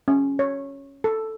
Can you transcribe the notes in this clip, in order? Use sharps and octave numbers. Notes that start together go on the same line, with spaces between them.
C#4
C#5
A4